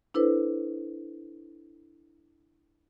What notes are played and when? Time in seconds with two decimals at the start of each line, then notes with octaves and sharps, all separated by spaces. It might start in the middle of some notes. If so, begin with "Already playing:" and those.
0.14 D4 E4 A4 B4 C5